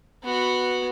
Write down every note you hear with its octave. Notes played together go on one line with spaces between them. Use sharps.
B3 F#4